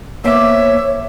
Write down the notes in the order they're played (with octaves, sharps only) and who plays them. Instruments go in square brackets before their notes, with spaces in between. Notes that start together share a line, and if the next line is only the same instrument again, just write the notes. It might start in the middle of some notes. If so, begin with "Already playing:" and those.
[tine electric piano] A#3 B3 B6 [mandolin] C5 D6 [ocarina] C#5 [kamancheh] E5